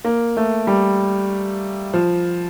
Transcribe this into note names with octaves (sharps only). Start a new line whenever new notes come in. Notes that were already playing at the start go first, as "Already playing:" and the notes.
A#3
A3
G3
F3